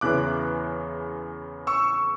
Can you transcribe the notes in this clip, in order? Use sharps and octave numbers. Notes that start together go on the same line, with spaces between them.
E2 C#3 E3 D6 F#6
C#6 E6